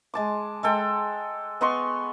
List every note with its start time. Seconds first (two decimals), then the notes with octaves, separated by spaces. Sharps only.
0.14 G#3 A5 D6
0.63 G#3 A4 G5
1.61 B3 D#5 C6 C#6